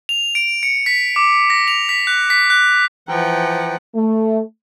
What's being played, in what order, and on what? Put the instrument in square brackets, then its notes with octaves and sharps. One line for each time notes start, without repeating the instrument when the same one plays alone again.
[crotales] F7
D7
C#7
B6
D6
A#6
F7
B6
F#6
B6
F#6
[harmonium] E3 G5 A#5 [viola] F3 F#5
[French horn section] A3